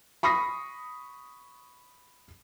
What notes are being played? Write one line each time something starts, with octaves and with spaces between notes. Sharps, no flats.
B5 C#6 D#6 A#6 C7